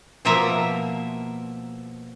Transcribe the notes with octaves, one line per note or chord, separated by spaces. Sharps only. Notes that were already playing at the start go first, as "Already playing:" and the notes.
B2 F3 A#3 A#4 E5 A#5